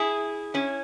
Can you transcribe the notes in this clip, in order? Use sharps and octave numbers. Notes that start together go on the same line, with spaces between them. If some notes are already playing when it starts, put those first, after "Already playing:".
Already playing: E4 G#4
C#4 E4